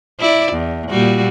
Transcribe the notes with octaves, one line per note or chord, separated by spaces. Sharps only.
E4 D5
E2
A#2 G3 F#4